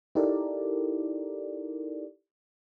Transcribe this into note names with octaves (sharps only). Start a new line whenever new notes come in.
D#4 E4 G4 A4 A#4 D5